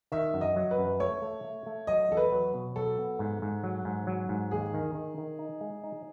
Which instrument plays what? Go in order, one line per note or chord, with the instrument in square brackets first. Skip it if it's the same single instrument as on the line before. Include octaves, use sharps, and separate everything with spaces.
[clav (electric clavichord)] D#3 [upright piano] E5
[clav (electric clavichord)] F#2
[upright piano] D#5
[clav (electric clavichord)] F#3
[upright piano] B4
[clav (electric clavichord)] F#2
[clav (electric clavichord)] A3 [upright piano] C#5
[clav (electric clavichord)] A3
A3
A3
[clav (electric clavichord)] F#3 [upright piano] D#5
[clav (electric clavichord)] E2 [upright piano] A4
[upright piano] B4
[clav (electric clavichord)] F#3
B2
[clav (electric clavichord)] F#3 [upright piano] A4
[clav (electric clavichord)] B3
G#2
G#2
F#3
G#2
F#3
G#2
[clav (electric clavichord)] D#2 [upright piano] G#4
[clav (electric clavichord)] D#3
D#3
D#3
D#4
G#3
D#4